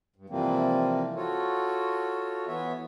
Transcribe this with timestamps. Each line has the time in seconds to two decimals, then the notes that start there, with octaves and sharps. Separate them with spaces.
0.16 G2
0.30 C3 E3 F3 G3 A#3 C4
1.16 F4 F#4 A4 C#5
2.47 E3 B3 C#5 E5